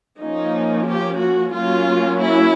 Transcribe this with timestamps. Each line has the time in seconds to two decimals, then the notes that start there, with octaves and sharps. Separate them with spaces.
0.20 F3 A#3 C#4 D#4
0.87 G4
1.20 F#4
1.55 F#3 A#3 C#4 F4
2.22 E4